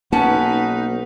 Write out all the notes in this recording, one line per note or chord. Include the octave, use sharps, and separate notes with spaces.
B1 A#3 C#4 D#4 B4 F#5 A5